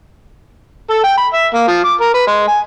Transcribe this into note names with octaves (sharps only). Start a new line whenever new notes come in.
A4
G5
B5
E5
A#3
F3
D6
A#4
B4
G#3
G#5